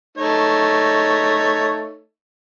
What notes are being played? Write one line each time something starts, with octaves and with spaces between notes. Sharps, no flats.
A3 D#4 C#5